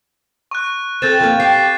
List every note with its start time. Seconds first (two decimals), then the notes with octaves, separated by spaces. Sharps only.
0.51 C#6 F#6
1.02 C4 A4 G6 A6 E7
1.20 F3 A#3
1.40 G4 C7